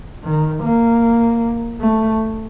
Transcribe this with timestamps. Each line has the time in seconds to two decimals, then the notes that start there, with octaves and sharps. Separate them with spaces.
0.24 D#3
0.63 A#3
1.81 A3